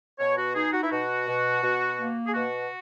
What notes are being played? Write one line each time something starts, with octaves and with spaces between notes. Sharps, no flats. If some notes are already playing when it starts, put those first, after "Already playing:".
B2 C#5
F#4
D#4 G#4
F#4
E4
B2 F#4
B2
B2
A#3
G#4
B2 F#4